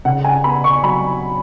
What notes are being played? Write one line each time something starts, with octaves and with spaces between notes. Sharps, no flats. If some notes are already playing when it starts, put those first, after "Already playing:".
C#3 F#5
G#5
B3 B5
C#6
F#3 B5